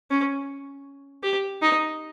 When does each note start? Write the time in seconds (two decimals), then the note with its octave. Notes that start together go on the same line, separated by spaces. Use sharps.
0.11 C#4
1.23 G4
1.62 D#4